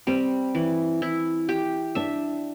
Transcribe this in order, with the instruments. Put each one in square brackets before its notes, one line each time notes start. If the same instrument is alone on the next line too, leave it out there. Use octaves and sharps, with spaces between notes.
[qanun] G3 [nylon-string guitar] C4
[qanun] E3
E4
G4
[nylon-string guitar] D4 [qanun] E5